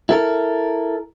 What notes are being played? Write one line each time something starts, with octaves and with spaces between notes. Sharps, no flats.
E4 A4 A#4